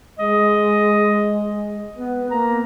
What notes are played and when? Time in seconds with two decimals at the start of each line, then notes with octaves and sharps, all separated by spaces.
0.19 G#3 D#5
1.96 B3 B4
2.31 A#3 A#5